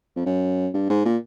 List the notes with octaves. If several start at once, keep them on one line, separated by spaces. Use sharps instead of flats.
F2
F#2
G2
G#2
A#2